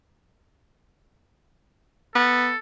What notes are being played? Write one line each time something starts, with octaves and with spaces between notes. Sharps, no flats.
B3 A4